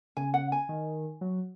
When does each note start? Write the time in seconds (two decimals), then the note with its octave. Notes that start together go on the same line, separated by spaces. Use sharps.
0.17 C#3 G#5
0.34 F#5
0.52 G#5
0.69 D#3
1.21 F#3